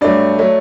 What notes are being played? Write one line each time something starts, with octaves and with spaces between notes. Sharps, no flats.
G2 F#3 A3 D5
F#3 A3